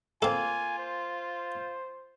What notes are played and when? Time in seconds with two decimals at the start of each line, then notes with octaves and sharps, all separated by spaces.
0.22 A#3 C4 F4 A4 G#5
0.79 C5